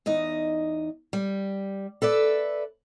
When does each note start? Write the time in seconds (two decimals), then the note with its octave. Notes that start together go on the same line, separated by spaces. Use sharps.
0.06 E2 D#4 D#5
1.13 G3
2.02 A4 B4 D5 E5